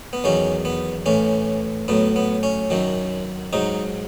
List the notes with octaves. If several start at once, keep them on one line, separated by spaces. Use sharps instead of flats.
B3
E2 D#3 F#3 C#4
B3
A2 E3 C#4
A2 F#3 B3
B3
C#4
F#2 D#3 F#3
G#2 F#3 D#4